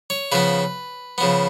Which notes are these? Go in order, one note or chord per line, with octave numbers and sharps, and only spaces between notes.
C#5
C#3 F3 B3 B4
C#3 F3 B3